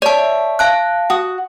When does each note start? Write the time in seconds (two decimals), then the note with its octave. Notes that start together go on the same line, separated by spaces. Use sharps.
0.02 C#5 D5 E5 A5
0.59 F5 A5 F#6
1.10 F#4 D#6